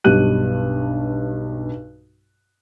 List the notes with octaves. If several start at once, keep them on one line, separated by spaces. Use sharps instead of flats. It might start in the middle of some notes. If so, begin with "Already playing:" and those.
B1 G2 G3 F#6 D#7